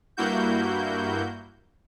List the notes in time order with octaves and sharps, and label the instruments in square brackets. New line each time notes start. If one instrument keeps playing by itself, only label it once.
[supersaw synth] G2 A#3 E4 F#4 G6